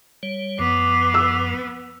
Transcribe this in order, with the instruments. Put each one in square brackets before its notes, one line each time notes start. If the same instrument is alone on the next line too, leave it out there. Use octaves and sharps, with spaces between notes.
[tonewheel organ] G3 C#5
[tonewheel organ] F#2 F3 [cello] B3 [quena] D6
[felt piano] E6